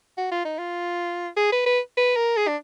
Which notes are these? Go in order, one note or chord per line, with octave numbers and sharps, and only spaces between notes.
F#4
F4
D#4
F4
G#4
B4
B4
B4
A#4
G#4
D4